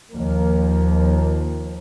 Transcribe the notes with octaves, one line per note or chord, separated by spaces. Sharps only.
D#2 F3 A#3